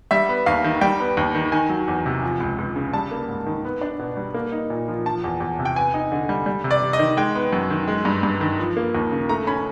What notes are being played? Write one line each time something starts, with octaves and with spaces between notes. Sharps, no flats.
G3 E5
B3
D#2 F5
D#3
G3 G5
B3
D#2
D#3
D#3 G#5
F#3
E2
C3
F3
C#2
C#2
C#3
G3 A5
A#3
G#2
D#3
B3
D4
B2
G3
A#3
D#4
A#2
F3
F3 A5
E2
E2
C3
G5
B3 G#5
D#4
D3
G3
G3
C3
D5
C3
D#5
D#3
G#3 G5
B3
F#2
D#3
G#3
G2
G2
D#3
F3
A#3
D#2
C#3
A3 A#5
C#4 B5